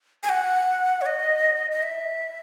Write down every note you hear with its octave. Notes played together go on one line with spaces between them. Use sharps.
G#5
F#5
C#5
D#5
D#5
E5